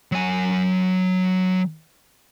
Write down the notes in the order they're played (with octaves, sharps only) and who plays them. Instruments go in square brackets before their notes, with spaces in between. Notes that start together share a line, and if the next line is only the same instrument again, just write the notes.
[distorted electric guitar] F#3 G#5